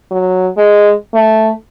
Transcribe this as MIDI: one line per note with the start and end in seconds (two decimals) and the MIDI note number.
0.11 0.48 54
0.57 0.92 56
1.14 1.51 57